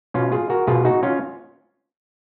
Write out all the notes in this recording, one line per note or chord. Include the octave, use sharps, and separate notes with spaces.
B2 C#4 F4
F4 G#4
F#4 A#4
B2 F4 G#4
D#4 F#4
C#4 F4